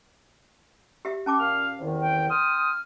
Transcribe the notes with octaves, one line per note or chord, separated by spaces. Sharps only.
G4 E5
C#4 A5 D6
A#2 F5 F6
E2 C3 D#3
G5
G5 C6 D#6 F6